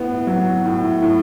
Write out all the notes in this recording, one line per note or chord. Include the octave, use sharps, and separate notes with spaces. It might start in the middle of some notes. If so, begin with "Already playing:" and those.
Already playing: A2 B3
F#3
A2
A2